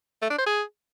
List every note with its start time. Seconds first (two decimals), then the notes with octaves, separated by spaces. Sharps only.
0.22 A3
0.30 D4
0.38 C5
0.47 G#4